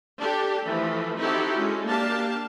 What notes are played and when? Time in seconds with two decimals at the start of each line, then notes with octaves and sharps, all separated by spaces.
0.19 D4 G4 A4
0.67 E3 F3 A3
1.19 C4 D#4 E4 F#4 G4 A4
1.56 G#3 C#4
1.88 A#3 D4 G4 F5 A5